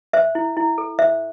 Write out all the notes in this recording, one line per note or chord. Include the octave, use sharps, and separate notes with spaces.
C5 E5
E4
E4
A4
C5 E5